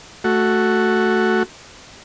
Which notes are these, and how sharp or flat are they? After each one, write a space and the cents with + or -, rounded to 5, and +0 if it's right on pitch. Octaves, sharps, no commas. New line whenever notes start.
A3 +0 F#4 +0